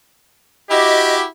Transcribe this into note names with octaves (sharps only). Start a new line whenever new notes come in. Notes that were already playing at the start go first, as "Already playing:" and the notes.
E4 F#4 G4 D#5